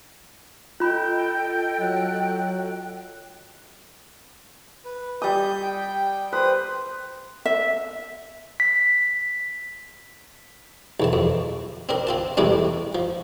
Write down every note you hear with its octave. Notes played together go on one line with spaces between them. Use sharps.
F4 A4 D#5 G5 B5 G6
F#3 F#6
B4
G3 D#6 G6
G5
B4 C5 D#6
E5
B6
B1 E2 A5
F2
C4 D4 A#4
C4 F4 A5
E2 A2 C3 G3 C4 C#4
F3